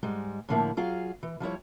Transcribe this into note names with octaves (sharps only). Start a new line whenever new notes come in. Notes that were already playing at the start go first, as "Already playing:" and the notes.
G#2 G3 G#3
A2 D3 F3 A#3 E4
F#3 F4 G#4 F5
E3
F3 G3 E4 C#5